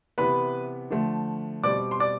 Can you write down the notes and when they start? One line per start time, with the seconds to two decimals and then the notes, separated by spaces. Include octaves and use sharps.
0.18 C3 E3 B3 B4 B5
0.90 D3 F3 A3
1.64 B2 G3 C4 D5 D6
1.91 C6
2.00 D5 D6